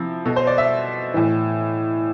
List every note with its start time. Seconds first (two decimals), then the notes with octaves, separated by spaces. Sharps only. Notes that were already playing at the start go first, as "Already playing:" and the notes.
Already playing: C3 F3 E4
0.25 B2 A4
0.36 C5
0.47 D5
0.58 E5
1.14 A2 E3